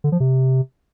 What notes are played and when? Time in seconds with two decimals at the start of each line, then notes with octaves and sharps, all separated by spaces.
0.04 D3
0.12 F3
0.20 C3